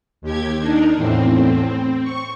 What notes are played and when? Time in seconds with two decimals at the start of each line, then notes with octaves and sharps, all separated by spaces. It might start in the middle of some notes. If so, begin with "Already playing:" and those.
0.21 D#2 G4 G#6
0.59 D4 D#4 A#4
0.94 E2 A2 C4
1.61 C4
2.02 C#6